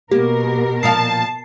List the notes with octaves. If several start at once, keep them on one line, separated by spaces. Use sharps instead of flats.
B2 A#3 G4 A#4
A#2 F3 F5 A5 C7